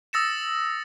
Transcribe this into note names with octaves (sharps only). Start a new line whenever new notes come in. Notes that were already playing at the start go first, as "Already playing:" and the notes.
D#6 E6 A6 A#6 C#7 E7